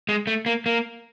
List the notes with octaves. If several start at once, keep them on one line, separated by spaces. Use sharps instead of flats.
G#3
A3
A#3
A#3